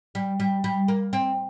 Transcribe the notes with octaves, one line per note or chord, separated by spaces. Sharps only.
G3
G3
G3
A#3
C4